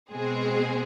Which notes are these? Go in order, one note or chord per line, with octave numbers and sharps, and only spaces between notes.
B2 G#3 C4 G#4